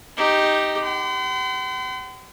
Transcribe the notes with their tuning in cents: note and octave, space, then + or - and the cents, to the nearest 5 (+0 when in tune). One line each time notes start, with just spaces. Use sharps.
D#4 +0 G4 +0
F#5 +45 C6 -40